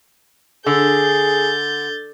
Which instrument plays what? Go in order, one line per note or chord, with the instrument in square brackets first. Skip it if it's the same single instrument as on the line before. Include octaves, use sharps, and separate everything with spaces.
[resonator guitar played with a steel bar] D3 [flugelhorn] G#4 [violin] G6 A6